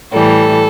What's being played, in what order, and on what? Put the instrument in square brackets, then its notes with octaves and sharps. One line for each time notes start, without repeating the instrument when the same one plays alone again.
[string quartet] A2 E3 G3 A4